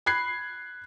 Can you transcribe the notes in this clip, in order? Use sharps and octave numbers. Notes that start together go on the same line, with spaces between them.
B5 F#6 G#6 C7